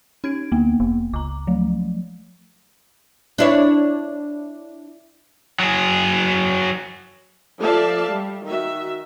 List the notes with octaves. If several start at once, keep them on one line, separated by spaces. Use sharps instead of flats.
C#4 D#4 G#6 D7
D2 A#3 B3
F1
C#2 A#5 D6
F3 F#3 A3
D4 E4 C#5
F#3 G#4
F3 A4 D5 E5 F5 A5
G3
D#3 F#4 E5